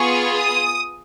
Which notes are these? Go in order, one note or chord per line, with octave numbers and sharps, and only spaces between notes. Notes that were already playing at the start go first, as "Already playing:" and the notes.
Already playing: B3 F4 G#4 C#6
D#6